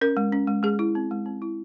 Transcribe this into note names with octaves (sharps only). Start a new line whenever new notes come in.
C#4 A#4
G#3
C#4
G#3
G#3 G#4
E4
C4
G#3
C4
E4